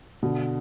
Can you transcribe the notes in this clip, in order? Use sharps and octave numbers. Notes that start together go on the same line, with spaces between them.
B2 D3